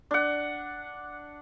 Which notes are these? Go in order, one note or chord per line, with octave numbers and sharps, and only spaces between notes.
D4 F#5